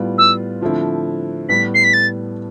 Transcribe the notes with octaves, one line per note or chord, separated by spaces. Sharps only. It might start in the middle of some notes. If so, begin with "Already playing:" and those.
Already playing: A2 G3 B3 F4
E6
D3 F3 A3 C4 E4
A2 G3 B3 B6
C7
B6
A6